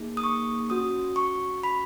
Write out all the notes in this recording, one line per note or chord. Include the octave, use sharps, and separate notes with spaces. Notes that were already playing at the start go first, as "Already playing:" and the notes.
Already playing: A#3 D#4 G#4
D#6
C#6
C#4 F#4 D#6
C#6
B5